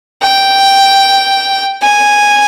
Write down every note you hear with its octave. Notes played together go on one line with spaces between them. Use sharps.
G5
G#5